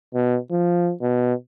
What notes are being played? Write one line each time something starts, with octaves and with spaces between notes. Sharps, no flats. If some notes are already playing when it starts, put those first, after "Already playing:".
B2
F3
B2